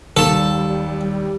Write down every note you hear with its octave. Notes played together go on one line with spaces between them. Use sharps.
D#2 G3 A4 A5